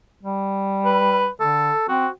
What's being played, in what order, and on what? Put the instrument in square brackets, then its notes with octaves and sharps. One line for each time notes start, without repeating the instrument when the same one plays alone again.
[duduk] G3
[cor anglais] B4
[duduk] D3 [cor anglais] A4
[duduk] C4 [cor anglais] F#4